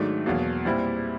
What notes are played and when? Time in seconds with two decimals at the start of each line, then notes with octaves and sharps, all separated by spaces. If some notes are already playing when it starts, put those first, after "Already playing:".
Already playing: G#2 D#3 F#3 A3 D4
0.26 E2 B2 F#3 A#3
0.65 A#2 G3 C4 E4